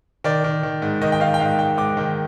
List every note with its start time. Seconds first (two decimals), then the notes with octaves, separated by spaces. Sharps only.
0.24 D#3 D5
0.44 D#3
0.63 D#3
0.82 G#2
1.01 D#3 D#5
1.12 G5
1.20 D#3 F5
1.34 G5
1.39 G#2 F5
1.58 G#2 G5
1.77 G#2 D6
1.97 D#3